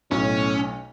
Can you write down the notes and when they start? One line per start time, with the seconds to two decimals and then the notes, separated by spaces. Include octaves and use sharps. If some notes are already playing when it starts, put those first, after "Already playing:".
0.11 B1 A2 C#4